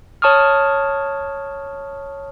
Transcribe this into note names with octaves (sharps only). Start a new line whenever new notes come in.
C#5 A5 C#6 D#6 F6